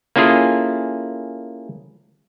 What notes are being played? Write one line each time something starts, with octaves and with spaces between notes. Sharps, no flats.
A#3 C#4 E4 F4 G#4 A4